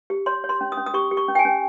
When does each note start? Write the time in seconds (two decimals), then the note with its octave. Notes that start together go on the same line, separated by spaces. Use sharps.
0.10 G4
0.26 C#5 C6
0.44 C#5
0.49 C6
0.61 C#4
0.72 D#6
0.77 C#4
0.86 D#6
0.94 G4 C#6
1.11 G4
1.17 C#6
1.28 C#4
1.35 G5
1.39 G#5
1.45 C#4